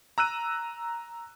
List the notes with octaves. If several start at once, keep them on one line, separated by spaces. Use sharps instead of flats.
A#5 E6 F#6 D#7